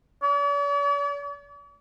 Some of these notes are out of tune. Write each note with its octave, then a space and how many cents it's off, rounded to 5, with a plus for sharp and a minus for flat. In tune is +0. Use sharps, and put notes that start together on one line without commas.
D5 -45